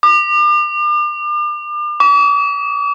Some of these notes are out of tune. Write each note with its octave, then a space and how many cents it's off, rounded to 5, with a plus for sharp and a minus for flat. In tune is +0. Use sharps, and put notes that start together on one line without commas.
D6 +40
D6 -45